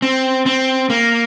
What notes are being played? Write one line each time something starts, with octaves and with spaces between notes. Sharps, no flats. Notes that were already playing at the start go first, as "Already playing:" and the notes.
C4
C4
A#3